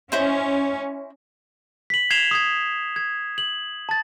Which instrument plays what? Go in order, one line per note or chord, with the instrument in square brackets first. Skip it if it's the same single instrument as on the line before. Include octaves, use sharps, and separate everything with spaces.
[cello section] C#4 [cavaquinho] E4 C5 D#5
[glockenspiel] B6 F#7
G#6 C7 E7 F7 G7
D#6 G#6
G#6
F#7
A5 A6